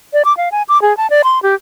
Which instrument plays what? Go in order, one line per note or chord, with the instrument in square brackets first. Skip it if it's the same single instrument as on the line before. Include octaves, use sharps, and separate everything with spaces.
[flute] D5
D6
F5
G#5
D6
G#4
A5
D5
C6
G4